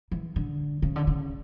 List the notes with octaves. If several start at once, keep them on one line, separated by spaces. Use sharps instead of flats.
E3
D3
C#3
D3
C#3